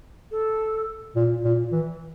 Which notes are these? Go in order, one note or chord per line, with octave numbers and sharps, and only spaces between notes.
A4
A#2
A#2
E3